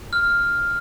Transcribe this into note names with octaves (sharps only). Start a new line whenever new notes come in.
F6